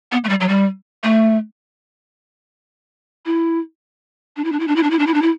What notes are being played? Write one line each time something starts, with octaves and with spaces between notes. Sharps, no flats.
B3
A3
G3
F#3
G3
A3
E4
D4
E4
D4
E4
D4
E4
D4
E4
D4
E4
D4
E4